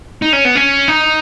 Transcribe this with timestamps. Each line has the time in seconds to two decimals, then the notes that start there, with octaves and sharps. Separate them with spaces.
0.22 D#4
0.33 C#4
0.45 B3
0.55 C#4
0.88 D#4